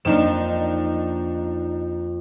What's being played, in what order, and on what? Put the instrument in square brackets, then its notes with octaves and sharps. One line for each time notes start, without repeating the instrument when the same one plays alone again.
[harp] F2 F3 A#3 [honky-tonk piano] D4 D#4 E7